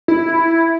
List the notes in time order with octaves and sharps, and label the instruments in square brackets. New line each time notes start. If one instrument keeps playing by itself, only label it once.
[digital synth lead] E4